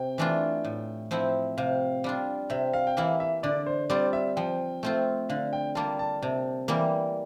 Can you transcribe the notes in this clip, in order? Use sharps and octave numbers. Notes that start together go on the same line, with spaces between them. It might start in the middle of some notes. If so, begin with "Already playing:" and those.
Already playing: C3 G5
E3 A3 D4 F4
A2
F3 C4 E4
C3 F5
G3 D4 F4
C3 E5
F5
G5
E3 A#3 E4 F5
E5
D3 D5
C5
G3 C4 F4 D5
E5
F3 G5
A3 C4 F4
D3 F5
G5
G3 A#3 F4 A5
A5
C3 A5
E3 G3 A#3